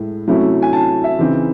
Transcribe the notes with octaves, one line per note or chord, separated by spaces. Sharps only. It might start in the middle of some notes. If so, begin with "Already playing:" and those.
Already playing: A2 G#3 E4
C3 F#3 A3 C#4 E4
G#5
A5
E5
C#3 E3 C4 D#4